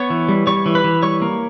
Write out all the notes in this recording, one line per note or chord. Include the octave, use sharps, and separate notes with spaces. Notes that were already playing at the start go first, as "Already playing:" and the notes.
Already playing: B3 C#5 C#6
E3
G3
G3 C#5 C#6
E3
B4 B5
E3
G3 C#5 C#6
A#3